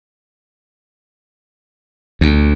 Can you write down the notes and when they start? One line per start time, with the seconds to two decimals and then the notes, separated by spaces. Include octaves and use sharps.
2.21 D2